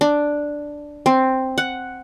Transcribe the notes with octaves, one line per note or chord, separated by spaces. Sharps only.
D4
C4
F#5